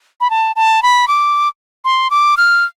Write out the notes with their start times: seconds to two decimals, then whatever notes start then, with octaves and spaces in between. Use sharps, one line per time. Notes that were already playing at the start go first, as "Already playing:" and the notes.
0.21 B5
0.30 A5
0.56 A5
0.83 B5
1.08 D6
1.85 C6
2.10 D6
2.37 F6